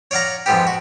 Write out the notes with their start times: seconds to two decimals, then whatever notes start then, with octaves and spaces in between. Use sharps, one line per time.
0.11 C#5 D5 F5 F#5 A#5
0.46 F2 G#2 B3 G4
0.67 F#4